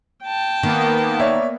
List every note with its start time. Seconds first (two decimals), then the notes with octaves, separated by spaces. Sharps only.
0.25 G5 A5
0.63 D#3 A#3 B3
1.19 C#5 D5 E5